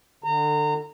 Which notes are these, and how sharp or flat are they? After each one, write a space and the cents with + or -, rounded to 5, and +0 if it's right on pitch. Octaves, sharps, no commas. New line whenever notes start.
D3 +25 A#5 -25